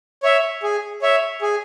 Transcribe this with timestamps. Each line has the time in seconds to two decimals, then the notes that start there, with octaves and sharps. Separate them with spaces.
0.23 C#5 E5
0.63 G#4
1.02 C#5 E5
1.42 G#4